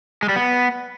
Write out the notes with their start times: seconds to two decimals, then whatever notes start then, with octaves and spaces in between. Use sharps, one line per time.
0.23 G#3
0.29 G3
0.36 B3